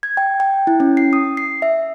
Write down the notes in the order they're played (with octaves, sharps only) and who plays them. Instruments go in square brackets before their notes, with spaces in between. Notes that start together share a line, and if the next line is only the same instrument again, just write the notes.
[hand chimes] G#6
G5
G5
E4
C#4
C7
D#6
C7
E5